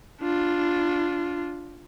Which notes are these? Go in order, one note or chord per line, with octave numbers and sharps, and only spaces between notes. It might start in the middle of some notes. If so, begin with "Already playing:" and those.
D4 F4